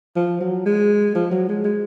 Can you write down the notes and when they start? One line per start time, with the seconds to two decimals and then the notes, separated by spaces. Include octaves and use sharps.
0.16 F3
0.41 F#3
0.66 G#3
1.15 F3
1.31 F#3
1.49 G#3
1.64 G#3